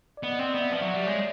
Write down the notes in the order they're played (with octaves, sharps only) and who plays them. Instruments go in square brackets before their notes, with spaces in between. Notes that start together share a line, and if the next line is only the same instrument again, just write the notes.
[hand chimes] D5
[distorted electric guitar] B3 [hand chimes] D#5
[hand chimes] D#5
[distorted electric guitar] C4
[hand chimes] D5
[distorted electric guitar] B3 [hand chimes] E5
[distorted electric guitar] F3 [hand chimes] F5
[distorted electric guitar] F#3 [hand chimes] E5
[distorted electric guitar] G3 [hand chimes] D5
[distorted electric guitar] G#3 [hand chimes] C#5